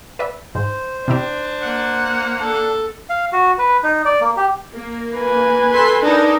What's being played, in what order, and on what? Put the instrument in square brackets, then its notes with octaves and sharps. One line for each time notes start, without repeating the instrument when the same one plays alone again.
[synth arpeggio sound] B4 D5 E5
[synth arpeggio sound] G#2 [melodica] C5
[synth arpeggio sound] C3 E4 G4 [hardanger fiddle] D4
[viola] A#3 F#5
[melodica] D4 [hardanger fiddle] A4
[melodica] F5
F#4
B4
D#4
D5
A#3
G4
[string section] A#3
[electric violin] B4 G#5
[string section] A4 C6 B6
[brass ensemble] D4 [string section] D#4 A4 A#4